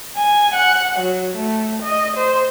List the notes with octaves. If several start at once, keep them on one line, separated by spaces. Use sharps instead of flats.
G#5
F#5
F#3
A3
D#5
C5